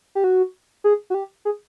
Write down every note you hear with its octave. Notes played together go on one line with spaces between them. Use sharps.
G4
F#4
G#4
F#4
G4
G#4